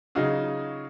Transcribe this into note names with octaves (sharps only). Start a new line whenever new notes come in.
C#3 F#3 D#4 F4 F#4 G#4